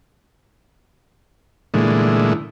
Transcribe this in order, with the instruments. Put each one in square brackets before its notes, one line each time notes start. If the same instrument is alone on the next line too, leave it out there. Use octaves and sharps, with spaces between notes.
[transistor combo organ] A#2 D3 E3 G#3 A3